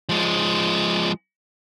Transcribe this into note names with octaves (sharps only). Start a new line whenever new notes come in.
F3 G#3